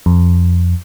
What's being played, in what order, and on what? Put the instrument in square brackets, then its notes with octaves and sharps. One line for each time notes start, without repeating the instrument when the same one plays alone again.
[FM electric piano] F2